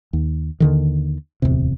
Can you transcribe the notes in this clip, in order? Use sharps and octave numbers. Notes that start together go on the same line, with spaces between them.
D#2
D#2 D3 D#3
D1 G1 E2 C3